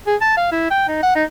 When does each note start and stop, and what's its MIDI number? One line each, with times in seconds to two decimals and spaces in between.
0.07 0.15 68
0.21 0.37 81
0.37 0.48 77
0.52 0.70 64
0.71 0.85 79
0.88 0.99 63
1.03 1.11 78
1.15 1.24 63